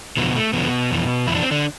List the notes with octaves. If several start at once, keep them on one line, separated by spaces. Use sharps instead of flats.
E2 B2 D3 F3 B3
A3
E2 B2 D3 F3 B3
F2 E3
F2 E3 D4 E4
C4
D3 D4